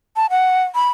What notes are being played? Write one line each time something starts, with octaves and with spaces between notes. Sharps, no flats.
A5
F#5
B5